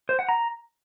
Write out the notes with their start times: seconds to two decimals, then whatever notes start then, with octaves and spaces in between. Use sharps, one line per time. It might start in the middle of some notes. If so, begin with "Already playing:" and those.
0.09 C5
0.19 F#5
0.29 A#5